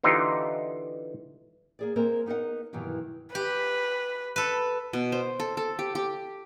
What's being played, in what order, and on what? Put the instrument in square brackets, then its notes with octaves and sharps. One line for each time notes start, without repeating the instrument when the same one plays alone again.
[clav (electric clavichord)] D3 E3 D#4 F4 G4 D#5
[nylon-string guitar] A#3 G#4 D5
G#3 A#3 C4 A#4 C5 D#5
B3 D#4 A#4 D#5 F#5
G2 B2 D#3 E3 F#3
[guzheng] G4 [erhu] B4
[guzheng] A4 B4
[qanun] B2
C5
A4
A4
G4
G4